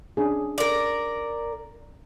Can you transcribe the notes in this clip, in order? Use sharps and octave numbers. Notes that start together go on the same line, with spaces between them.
C#4 D4 G#4
A#4 D5